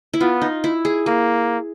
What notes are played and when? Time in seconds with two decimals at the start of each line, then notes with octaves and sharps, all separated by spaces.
0.13 E4
0.21 B3 F4
0.42 D#4
0.64 E4
0.85 G#4
1.06 A#3 G#4